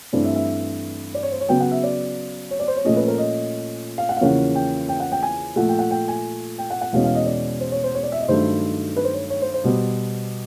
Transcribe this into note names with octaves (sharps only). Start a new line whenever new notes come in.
G2 E3 A3 C4 D5
E5
E5
D5
C#5
C5
C#5
C#3 F#3 B3 G5
F#5
E5
D5
C#5
D5
C5
C#5
A#2 F3 A3 C#4 D#5
B4
A#4
D#5
F5
F#5
F5
E2 C#3 F3 A#3 C#4 F#5
G5
G5
F#5
G5
G#5
A#2 F3 A3 F#5
G5
F#5
G5
G#5
G5
F#5
F#5
E2 B2 G#3 C#4 F5
F5
D#5
D5
C5
C#5
C5
C#5
D5
E5
D#5
G2 D#3 F#3 A3 C5
B4
C5
C#5
C#5
C5
C5
B2 G3 B3